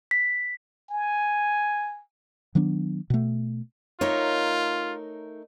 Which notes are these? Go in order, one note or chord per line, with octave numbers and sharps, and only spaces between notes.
B6
G#5
D#3 F#3 B3 D4
B2 A3
A3 D#4 F4 A#4 C#5